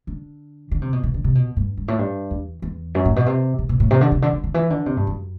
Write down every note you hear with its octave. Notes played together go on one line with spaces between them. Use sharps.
D3
D3
C3
B2
B2
D3
C3
B2
G2
G2
A2
G2
E2
E2
F#2
A2
B2
C3
B2
B2
A2
C3
D3
C3
D3
D3
D3
E3
D3
C3
G2
F#2